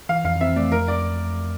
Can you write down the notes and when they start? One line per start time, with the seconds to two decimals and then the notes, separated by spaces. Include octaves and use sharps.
0.09 E3 F5
0.25 F2 F5
0.41 C4 E5
0.56 A3 D5
0.72 F2 A#4
0.88 D5